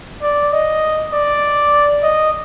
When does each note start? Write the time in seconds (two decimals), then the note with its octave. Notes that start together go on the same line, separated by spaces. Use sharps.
0.22 D5
0.53 D#5
1.13 D5
2.03 D#5